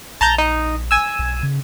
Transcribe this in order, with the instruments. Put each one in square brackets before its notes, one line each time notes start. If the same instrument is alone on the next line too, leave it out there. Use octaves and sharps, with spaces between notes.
[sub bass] A#1 [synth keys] A5 A#5 G6
[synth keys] D#4
G#5 E6
[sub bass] B1
C#3